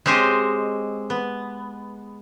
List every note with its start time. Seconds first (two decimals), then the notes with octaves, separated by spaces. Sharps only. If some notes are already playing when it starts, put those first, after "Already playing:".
0.06 G#3 C4 G4 C5 C#5 D#5
1.10 B3